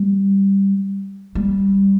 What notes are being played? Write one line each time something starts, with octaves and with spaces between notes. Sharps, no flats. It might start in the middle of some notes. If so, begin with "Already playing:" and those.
Already playing: G3
G3